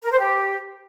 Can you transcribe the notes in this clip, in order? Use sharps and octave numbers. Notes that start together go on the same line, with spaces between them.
A#4
C5
G4